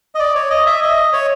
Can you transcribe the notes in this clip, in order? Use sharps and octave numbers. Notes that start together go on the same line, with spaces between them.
D#5
D5
C#5
D#5
E5
D#5
C#5